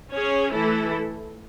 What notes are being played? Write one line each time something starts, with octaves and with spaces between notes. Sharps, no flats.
C#4 G#4 C#5
E3 A3 E4 A4